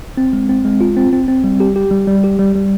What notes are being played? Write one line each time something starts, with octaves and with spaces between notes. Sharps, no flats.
C4
G#3
C4
G#3
F4
C4
C4
C4
G3
G4
G4
G3
G3
G4
G3
G3